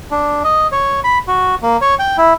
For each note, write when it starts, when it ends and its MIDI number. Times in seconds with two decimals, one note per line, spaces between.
0.11 0.43 62
0.44 0.67 75
0.72 1.00 73
1.04 1.18 83
1.27 1.55 66
1.62 1.77 58
1.81 1.95 73
1.99 2.17 79
2.18 2.33 64